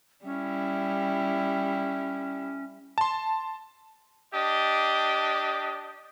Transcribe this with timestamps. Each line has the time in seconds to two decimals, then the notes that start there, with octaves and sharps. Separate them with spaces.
0.25 G3 C#4 E4
2.98 A5 C6
4.34 D4 G4 D#5